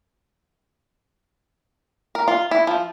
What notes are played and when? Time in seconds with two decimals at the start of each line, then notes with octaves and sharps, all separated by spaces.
2.15 A#4
2.28 F4
2.51 E4
2.67 F3